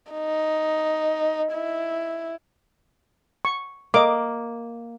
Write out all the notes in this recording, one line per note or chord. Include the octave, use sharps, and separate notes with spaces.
D#4
E4
C#6
A#3 D#5 D6